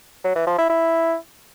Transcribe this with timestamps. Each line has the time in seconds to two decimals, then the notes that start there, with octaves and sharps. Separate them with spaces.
0.24 F#3
0.36 E3
0.47 F3
0.58 E4
0.70 E4